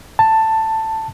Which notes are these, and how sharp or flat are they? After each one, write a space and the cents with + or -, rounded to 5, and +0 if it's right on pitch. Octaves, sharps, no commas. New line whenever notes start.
A5 +10